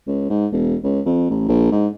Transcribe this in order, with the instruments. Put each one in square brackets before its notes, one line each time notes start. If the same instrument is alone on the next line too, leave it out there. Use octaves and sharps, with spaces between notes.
[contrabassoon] C#2
G#2
E1
C#2
F2
A1
A#1
G#2